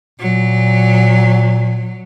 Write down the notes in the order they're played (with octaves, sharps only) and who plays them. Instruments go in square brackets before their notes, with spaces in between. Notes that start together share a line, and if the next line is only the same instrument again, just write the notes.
[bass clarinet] A#2 [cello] F#3